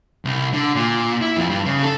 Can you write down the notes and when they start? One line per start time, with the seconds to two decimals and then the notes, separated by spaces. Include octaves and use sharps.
0.25 C2
0.53 D3
0.75 A#2
1.21 E4
1.37 F2
1.50 G2
1.65 C#3
1.83 A4